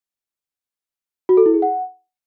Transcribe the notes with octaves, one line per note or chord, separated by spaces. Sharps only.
F#4
A4
E4
G#4
F#5